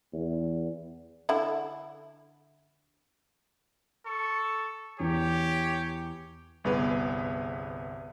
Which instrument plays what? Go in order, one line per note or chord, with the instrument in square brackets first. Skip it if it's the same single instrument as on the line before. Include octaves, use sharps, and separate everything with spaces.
[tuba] E2
[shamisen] D3 E4
[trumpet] A4 [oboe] C#6
[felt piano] E2 [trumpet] G4 [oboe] C#5
[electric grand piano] G1 C2 B3 G#4 B4